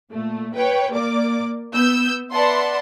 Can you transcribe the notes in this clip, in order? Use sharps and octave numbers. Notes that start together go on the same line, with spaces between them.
A#2 A3
B4 C#5 G5
A#3 D5 D6
B3 E6 G6
B4 D5 E5 F#5 A5 C6